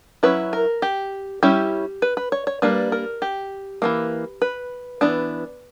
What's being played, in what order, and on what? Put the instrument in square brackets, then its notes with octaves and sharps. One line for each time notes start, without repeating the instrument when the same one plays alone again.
[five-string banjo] F#3 C#4 E4 B4
A#4
G4
G3 C#4 E4 G4
B4
B4
C#5
C#5
G3 A#3 D4 B4
A#4
G4
E3 G3 A#3
B4
E3 B3 D4